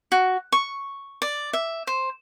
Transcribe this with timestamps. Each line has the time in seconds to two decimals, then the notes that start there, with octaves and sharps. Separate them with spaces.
0.12 F#4
0.52 C#6
1.22 D5
1.53 E5
1.87 C5